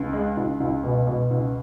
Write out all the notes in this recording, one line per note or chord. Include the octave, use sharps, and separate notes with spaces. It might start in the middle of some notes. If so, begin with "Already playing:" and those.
Already playing: C#2
G#3
C#2
C#2
B2
B2
C#2